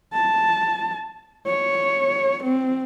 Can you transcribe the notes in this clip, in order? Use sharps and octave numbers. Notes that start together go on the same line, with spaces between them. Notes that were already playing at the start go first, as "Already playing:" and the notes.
A5
C#5
C4